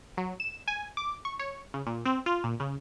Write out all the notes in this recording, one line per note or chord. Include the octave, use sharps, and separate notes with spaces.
F#3
E7
G#5
D6
C#6
C#5
C#3
A#2
C4
F4
A#2
C#3